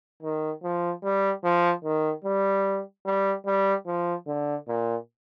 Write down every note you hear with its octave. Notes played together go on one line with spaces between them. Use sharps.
D#3
F3
G3
F3
D#3
G3
G3
G3
F3
D3
A#2